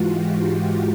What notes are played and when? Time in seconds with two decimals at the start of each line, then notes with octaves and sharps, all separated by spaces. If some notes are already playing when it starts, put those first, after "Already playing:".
Already playing: G#2 E3 G#3 F4 F#4
0.09 G4